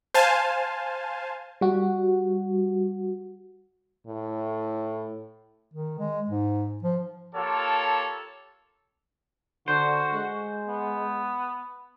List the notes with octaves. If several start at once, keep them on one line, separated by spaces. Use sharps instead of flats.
C5 F5 G#5 A5
G3 F#4
A2
D#3
G#3
G#2
F3
A#3 F4 G4 A4 C#5 A5
D3 F#4 C5
G#3
B3